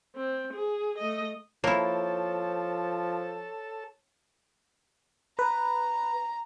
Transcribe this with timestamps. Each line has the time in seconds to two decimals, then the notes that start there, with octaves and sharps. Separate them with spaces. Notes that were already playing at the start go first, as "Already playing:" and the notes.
0.16 C4
0.53 G#4
0.98 A3 D#5
1.64 F3 A#3 E4 A4 C#5 A5
5.39 B4 A#5